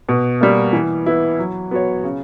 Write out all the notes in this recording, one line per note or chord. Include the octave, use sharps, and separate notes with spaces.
B2
G3 A#3
E3
B3 E4
F#3
B3 F#4 C#5
C#3